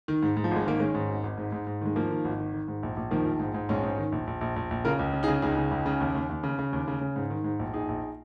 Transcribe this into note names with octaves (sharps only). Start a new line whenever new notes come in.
D#3
G#2
G#2
F3
G#1 G#3
D#3 A#3
D#3 G#3 C#4
G#2
G#1
G#1
G#2
G#2
G#2
D#3 G#3
D#3 F3 A#3
D#3
G#1
D#3
D#3
G#2
A#1
A#1
D#3 F3 A#3
A#1
G#2
G#2
A#1 G#3 C#4
G#2
D#3
A#1
A#1
A#1
A#1
A#1
C#3 F4 A#4
C#2
C#3
D#4 G#4
C#3
C#2 D#4 G#4
C#3
C#2
C#3
D#2
D#2
D#2
C#3
C#3
D#2
C#3
C#3
G#2
D#3
G#2
A#1
A#1 D#4 G#4
A#1